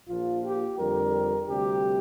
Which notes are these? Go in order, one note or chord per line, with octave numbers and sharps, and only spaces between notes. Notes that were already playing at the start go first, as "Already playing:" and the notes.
A#1 A#2 F3 F4
G4
F2 D3 G3 A#4
D2 C3 G3 G4